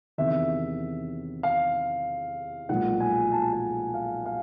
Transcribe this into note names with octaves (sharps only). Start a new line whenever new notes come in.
E2 C3 D#3 E5
F5
B1 A#2 F3 G#3 F#5
G#5
A5
G#5
F5
F5